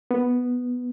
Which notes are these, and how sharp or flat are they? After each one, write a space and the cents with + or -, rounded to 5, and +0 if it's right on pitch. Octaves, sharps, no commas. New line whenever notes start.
B3 +0